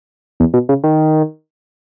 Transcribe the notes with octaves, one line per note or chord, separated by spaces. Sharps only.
E2
B2
C#3
D#3